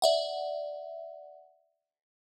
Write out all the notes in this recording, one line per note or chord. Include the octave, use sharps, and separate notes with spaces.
D5 E5 F#5